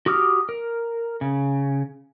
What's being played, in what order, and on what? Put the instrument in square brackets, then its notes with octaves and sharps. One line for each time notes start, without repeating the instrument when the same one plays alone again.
[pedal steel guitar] F#4 G4 D6 D#6 F6
A#4
C#3